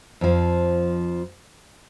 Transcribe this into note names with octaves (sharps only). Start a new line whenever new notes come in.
F2 F3